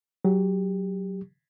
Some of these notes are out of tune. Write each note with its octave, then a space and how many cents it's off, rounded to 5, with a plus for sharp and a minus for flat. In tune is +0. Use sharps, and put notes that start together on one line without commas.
F#3 +20 G4 +20